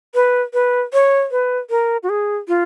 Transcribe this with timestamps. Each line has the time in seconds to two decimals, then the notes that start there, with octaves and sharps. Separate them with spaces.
0.15 B4
0.54 B4
0.93 C#5
1.31 B4
1.70 A#4
2.03 F#4
2.09 G#4
2.48 F4